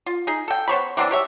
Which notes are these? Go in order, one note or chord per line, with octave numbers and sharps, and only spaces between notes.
F4
D#4 G#4
A4 G5
B3 C5 C#5 B5
E3 F#3 C4 D4
G4 C#5 E5